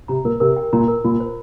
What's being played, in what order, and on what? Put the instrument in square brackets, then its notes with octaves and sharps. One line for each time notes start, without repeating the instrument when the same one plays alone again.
[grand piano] C3 [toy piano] A#5
[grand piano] A#2 [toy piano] A#4
[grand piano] C3 [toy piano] A#4
[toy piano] G5
[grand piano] A#2 [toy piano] A#5
[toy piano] A#4
[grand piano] A#2 [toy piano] F4
[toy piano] C5